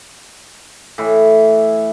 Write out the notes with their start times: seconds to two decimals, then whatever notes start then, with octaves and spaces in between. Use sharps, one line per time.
0.98 A2 E3